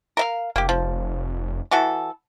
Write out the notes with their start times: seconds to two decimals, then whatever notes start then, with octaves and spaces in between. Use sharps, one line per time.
0.17 A#4 E5 F5
0.56 F1 A#3 G4
0.69 F3
1.71 E3 F#4 A4